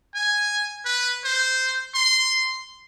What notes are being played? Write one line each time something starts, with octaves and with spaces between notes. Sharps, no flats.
G#5
B4
C5
C6